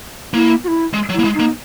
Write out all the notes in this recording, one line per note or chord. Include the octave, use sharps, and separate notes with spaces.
A#3 E4
F#4
E4
G#3
F#3
A#3 E4
G#3
D#4
A#3